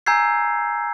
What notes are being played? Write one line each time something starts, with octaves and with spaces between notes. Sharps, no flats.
G#5 A#5 E6 G6 G#6 C7